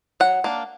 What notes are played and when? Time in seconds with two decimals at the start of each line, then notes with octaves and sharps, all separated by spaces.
0.20 F#3 F#5
0.44 A#3 D4